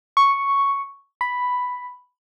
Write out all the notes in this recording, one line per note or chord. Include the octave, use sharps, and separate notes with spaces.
C#6
B5